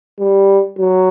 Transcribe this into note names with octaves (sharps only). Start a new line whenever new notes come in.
G3
F#3